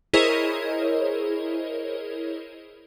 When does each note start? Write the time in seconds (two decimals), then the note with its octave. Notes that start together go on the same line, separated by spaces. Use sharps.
0.13 E4 G#4 A#4 C5 C#5 D#5